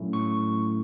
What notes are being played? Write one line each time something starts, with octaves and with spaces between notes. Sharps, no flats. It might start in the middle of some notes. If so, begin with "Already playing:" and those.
Already playing: A2 F#3 A3 C#4 E4
C#6